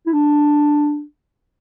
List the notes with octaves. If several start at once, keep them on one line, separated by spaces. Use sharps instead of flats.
E4
D4